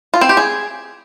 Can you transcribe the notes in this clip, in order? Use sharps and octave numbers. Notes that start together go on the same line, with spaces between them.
F4
C4
G4
G#4